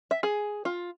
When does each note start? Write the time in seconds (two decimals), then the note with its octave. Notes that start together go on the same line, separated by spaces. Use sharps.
0.11 E5
0.23 G#4
0.65 F4